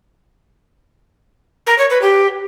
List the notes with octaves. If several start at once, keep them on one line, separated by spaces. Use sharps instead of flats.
A#4
C#5
B4
G4